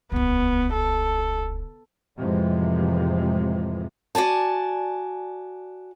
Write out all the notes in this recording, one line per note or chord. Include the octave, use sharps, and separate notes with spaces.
D#1 C#2 B3
A4
F2 A2 C3 E3 F3 G#3
F#4 D5 G#5 A5